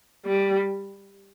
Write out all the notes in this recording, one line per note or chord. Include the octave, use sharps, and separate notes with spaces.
G3